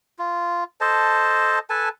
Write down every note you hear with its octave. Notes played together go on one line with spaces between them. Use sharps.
F4
A4 C5 D#5 A5
A4 B4 G#5 A5